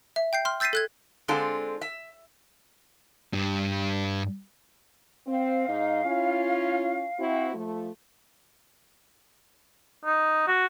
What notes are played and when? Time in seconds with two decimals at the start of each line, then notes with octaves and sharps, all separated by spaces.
0.16 E5
0.33 G5 G6 C7
0.45 C6 F6
0.60 E6 G6 A6 B6 C7 D#7
0.73 A4 F#6 G#6
1.28 D3 G#3 C4 D4 F4 A4
1.81 E5
3.33 G2 G3
5.27 C4 F5
5.67 G#2 D#4 D#5
6.05 C#4 E4 F4
7.19 C4 E4 F#4
7.54 F3 A3
10.05 D#4
10.48 F#4